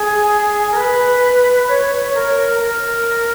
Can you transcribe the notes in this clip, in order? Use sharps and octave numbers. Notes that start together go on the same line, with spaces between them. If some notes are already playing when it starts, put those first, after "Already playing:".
Already playing: G#4
A#4
B4
C#5
A#4
A#4